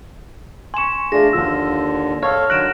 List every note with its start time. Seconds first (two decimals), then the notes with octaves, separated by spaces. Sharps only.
0.74 G#5 C6 C#6 E7
1.12 A3 D4 F4 G#4 D5 A#6
1.33 D#2 D3 F3 E6
2.23 A4 C#5 F5 F6
2.50 D3 D#3 F#3 F#6 A#6 D7 E7